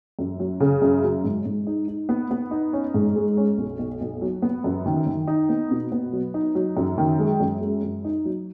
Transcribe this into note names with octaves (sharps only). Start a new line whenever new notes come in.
F#2
F#3
C#3
F#2
F#3
G#2
G#2
D#4
D#4
B3
B3
D#4
C#4
G#2
G#3
C#4
B1
B1
B1
F#3
B3
F#2
D#3
D#3
D#4
B3
B2
B3
F#3
D#4
F#3
F#2
D#3
G#3
F#2
G#3
F#2
D#4
F#3